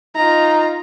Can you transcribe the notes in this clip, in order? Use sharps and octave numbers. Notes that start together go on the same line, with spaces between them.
D#4 F4 A#5